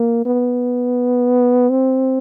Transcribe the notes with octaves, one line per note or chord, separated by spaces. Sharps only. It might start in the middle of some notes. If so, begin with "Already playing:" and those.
Already playing: A#3
B3
C4